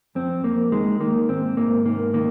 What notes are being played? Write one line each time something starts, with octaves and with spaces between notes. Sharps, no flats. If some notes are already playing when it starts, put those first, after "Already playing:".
F2 C4
F2 A#3
D#3 G#3
D#3 A#3
G#2 C4
G#2 A#3
D#3 A#3
D#3 A#3